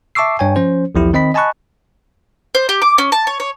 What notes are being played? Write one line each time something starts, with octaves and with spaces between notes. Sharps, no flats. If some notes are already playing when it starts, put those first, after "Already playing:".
E5 A5 C#6 D6 E6 C7
G2 C#5 G5 G#5
F3 C#4 C5
B1 E2 F3 E4 G4
D#3 C4 D#5 B5 B6
D#5 G#5 A5 B5 C#6 F#6
C5
G4
D6
C#4
A5
C#5
C#5